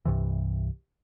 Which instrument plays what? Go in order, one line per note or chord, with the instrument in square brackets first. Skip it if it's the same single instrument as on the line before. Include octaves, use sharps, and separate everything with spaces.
[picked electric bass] C2 G2 C3 E3